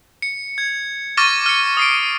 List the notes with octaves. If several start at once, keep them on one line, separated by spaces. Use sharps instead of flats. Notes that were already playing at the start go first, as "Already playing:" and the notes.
C#7
G#6
C#6 D6 F6 A6 A#6 D#7
F6 C#7
D#6 C7 D7